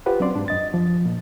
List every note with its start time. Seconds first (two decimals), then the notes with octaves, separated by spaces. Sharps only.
0.06 F4 G4 B4 C5 F#5
0.20 F#3 C4 C#4 D5 C6
0.35 G#2 D4
0.48 F#2 D#5 A6
0.74 F3
1.06 A#2